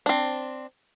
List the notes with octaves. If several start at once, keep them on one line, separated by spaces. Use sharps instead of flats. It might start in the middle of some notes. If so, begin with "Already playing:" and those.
C4 D4